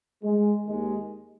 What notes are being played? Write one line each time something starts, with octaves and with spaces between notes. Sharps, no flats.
G#3
D#2 D#3 G#3